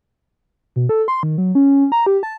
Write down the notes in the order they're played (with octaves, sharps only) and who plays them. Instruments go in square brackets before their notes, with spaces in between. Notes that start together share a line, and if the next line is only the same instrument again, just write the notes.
[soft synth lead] B2
A4
C6
D#3
F#3
C#4
A#5
G4
A5